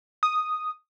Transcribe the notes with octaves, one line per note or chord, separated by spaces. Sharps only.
D#6